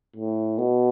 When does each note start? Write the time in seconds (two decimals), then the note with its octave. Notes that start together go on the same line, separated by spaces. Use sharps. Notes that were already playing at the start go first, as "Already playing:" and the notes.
0.16 A2
0.58 B2